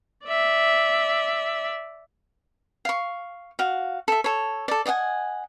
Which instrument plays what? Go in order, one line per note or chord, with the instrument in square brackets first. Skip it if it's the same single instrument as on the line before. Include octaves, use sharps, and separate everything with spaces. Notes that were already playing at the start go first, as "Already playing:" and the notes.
[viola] D5 E5
[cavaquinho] F5 C#6
F#4 F5
A4 E5
A4 C#5
A4 D5
D5 D#5 F#5 G#5